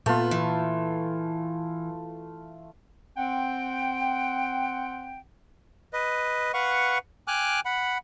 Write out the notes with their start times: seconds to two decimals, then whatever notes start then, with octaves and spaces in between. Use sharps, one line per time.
0.06 A#2 A3 B3 F4
0.31 E3
3.17 C4 F#5 G5
5.93 B4 D#5
6.54 B4 F5 F#5 C#6
7.28 G5 G#5 D6 F6 F#6
7.65 F#5 B5